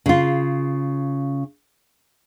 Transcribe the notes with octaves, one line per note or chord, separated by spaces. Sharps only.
C#3 F4